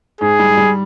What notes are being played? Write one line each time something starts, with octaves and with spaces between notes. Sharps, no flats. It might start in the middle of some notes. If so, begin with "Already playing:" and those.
G#2 G#4
G3
G3